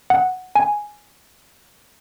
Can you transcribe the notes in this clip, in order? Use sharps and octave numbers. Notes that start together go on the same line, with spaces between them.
F#5
G#5